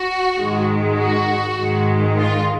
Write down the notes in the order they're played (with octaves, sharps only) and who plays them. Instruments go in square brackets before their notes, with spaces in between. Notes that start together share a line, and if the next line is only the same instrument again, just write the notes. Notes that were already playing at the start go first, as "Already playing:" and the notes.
Already playing: [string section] F#4
G#2 D#3 G#3
F#4
G#2 D#3 G#3
F4